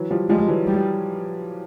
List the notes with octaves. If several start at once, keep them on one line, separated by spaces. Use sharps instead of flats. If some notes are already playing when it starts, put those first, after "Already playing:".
Already playing: E3 F#3
F3 G3
F3 G3 G#3
E3 F#3
G3